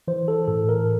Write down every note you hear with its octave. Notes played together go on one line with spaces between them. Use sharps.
E3 C5
A4
A2 A4
A#4